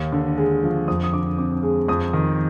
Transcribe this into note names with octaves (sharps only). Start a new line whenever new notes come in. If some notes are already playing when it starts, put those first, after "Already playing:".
Already playing: D#2
D3
G#3
F3
F2 D#6
D#6
D3 D6
C4 D6
G#3
F2 D#6
D#3